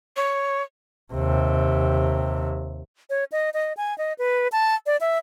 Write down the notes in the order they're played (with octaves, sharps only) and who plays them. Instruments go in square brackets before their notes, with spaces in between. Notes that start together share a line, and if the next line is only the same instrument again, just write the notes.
[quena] C#5
[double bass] D#2 C3
[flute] C#5
D#5
D#5
G#5
D#5
B4
A5
D5
E5